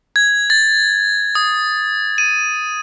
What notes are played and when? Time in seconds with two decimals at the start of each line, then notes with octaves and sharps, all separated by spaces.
0.16 G#6
0.50 A6
1.35 D#6
2.18 D#7